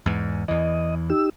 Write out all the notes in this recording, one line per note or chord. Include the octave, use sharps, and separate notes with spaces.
E2 G#2
E2 E3 D#5
D#4 G4 E6